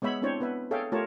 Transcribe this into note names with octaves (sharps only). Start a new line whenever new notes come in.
G#3 B3 C#5 E5 B5
C4 D4 E4 C5 C#5
B3 B4 E5
G#4 A4 C#5 E5 F5 G5
A3 F4 G4 A#4 C#5 A5